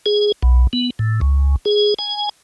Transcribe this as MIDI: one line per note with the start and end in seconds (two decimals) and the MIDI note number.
0.06 0.32 68
0.43 0.67 35
0.73 0.90 59
0.99 1.20 45
1.21 1.56 37
1.65 1.94 68
1.99 2.29 80